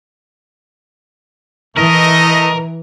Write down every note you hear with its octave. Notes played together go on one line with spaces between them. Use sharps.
E3 A3 A#4 D#5